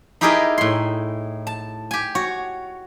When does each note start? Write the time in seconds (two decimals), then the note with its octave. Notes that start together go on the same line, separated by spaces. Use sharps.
0.21 D#4 E4 G4 G#4 A#4 D#5
0.58 A2 C6
1.47 A5
1.91 G4 G#5
2.15 F#4 C#5